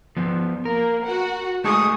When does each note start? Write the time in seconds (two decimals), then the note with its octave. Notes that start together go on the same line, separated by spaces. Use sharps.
0.17 F3 B3
0.65 A#3 A#4
1.05 F#4 F#5
1.64 G#3 A3 D#4 G#4 C#6 D#6